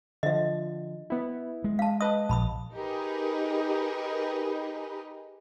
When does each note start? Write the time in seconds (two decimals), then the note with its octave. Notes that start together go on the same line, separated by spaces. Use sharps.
0.23 D3 F3 D#5 E5
1.10 B3 E4
1.64 G#3
1.79 F5 A5
2.01 B4 D#5 A5 D#6
2.29 A#1 A5 B5 D#6
2.73 D#4 G4 G#4 A#4 B4